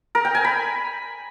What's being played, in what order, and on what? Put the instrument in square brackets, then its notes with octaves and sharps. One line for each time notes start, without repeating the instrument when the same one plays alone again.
[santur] A#4
G5
G#5
B5